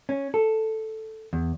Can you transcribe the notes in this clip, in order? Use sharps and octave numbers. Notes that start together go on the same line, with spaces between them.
C#4
A4
E2